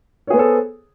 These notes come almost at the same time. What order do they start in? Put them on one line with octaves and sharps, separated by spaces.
C#5 G#4 B3 C5 A4